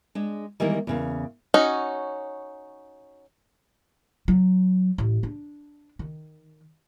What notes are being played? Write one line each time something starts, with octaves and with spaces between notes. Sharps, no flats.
G#3 D4
D#3 E3 G3 G#3 A#3 B3
E2 C#3 A#3
C#4 D#4 F#4
F#3
A1
D4
D#3